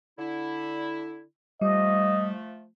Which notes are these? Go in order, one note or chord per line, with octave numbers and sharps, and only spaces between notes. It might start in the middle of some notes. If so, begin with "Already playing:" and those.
D3 E4
F3 G3 A3 D#5